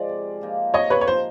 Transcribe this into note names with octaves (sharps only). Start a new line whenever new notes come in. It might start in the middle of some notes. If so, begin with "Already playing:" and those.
Already playing: F3 G#3 D5
C3
F3 A#3 D#4
C3 C#5 D#5
B4 C#5
C#5
F3 A#3 D#4 C5